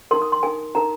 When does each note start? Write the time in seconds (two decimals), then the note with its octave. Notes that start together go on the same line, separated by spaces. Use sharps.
0.11 D#4 A#4 C6
0.22 D#6
0.32 C6
0.43 D#4 A#4 G#5
0.75 D#4 A#4 A#5